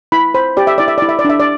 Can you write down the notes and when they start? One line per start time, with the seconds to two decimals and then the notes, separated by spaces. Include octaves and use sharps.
0.12 E4 B5
0.34 C5 B5
0.57 G4 D5
0.67 E5
0.78 E4 D5
0.88 E5
0.98 E4 D5
1.09 E5
1.19 D5
1.25 D4 E5
1.40 D5